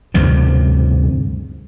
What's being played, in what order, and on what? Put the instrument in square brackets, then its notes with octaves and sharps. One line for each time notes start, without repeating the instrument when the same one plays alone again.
[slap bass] D2 G2 C3 F3